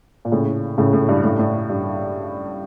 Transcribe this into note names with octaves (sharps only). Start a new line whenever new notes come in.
A#2
A2 C#3
A2 C#3
A2
G2
A2
A2
G2